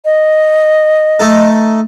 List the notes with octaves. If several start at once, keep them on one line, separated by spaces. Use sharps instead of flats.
D#5
A3 D#4 A4